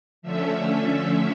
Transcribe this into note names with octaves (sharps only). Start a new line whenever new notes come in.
D3 F3 A3 C#4 E5